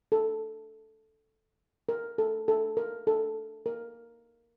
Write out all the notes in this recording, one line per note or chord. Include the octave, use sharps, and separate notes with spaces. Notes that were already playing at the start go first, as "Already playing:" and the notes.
A4
A#4
A4
A4
A#4
A4
A#4